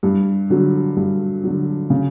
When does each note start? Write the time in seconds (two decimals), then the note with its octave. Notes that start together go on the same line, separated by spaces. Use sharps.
0.03 G2
0.50 D3 F#3
0.96 G2
1.44 D3 F#3
1.90 C#3